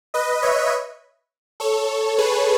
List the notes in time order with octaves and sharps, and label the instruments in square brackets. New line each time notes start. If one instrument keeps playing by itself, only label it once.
[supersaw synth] B4 D#5
C#5 E5
A4 C#5
G#4 B4